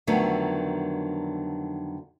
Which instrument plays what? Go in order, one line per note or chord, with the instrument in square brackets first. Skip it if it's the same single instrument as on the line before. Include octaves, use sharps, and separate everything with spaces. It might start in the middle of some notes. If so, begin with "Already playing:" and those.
[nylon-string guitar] F2 D3 D#3 F#3 A3 B3